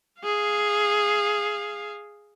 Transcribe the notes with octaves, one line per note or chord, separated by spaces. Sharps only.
G#4 F5